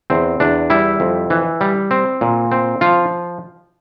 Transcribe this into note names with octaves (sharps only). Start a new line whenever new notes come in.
E2 C4
E2 D4
G3 E4
F2
E3
G3
C4
A#2
C4
F3 F4